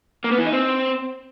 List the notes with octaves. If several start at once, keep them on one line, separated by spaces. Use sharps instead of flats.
A#3
B3
E3
D#4
C4